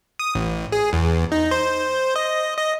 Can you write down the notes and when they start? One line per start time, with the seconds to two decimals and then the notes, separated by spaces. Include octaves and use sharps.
0.19 D#6
0.35 A1
0.72 G#4
0.93 E2
1.32 D#4
1.51 C5
2.16 D#5
2.58 D#5